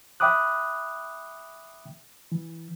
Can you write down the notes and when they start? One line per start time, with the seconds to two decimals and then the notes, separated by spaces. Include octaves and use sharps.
0.20 E5 G5 B5 D6 D#6 F#6
2.32 E3